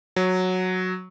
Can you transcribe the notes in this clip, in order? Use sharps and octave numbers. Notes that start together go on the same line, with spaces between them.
F#3